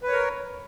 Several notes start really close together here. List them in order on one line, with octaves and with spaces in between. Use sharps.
B4 C#5 A#4